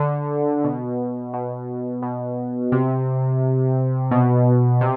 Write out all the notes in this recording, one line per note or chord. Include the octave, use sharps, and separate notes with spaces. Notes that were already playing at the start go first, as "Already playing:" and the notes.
Already playing: D3
B2
B2
B2
C3
B2
C3